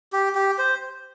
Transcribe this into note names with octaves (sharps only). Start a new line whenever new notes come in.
G4
G4
C5